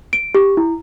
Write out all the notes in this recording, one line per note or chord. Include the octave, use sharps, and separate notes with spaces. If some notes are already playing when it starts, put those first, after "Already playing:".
D7
G4
E4